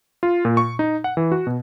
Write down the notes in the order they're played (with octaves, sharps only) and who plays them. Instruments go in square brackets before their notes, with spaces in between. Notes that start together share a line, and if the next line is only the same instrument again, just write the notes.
[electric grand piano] F4
A#2
C#6
D#4
F#5
E3
F#4
B2